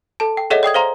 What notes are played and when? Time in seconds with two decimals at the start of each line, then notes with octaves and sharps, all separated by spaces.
0.20 A4 A5
0.37 G5
0.50 G#4 A4 C#5 D#5 E5 F#5
0.63 D5 G5 D#6 G#6
0.74 C5 F5 A#5 C6